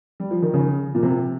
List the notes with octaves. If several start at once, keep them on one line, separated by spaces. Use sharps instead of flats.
G3
F3
D#3
C#3
A#2
C3